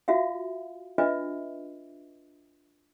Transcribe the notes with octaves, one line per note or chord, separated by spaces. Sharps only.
F4 F#4 E5 F5
D4 F4 B4 D#5 E5